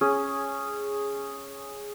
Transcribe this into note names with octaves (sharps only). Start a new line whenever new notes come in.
C#4 G#4 C#5